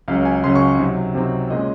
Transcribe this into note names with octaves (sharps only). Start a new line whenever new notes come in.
C#2 C#3 F#3 C#4 F5
G#5
C#2 C#3 F#3 C#4 C6
C#6
C3 F#3 C4 D#4
C3 F#3 C4 D#4
A#2 G#3 C#4 D#5